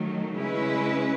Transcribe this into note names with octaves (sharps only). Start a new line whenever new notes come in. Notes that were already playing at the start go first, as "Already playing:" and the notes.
Already playing: D#3 F#3 A3
C#3 G#3 C#4 E4 B4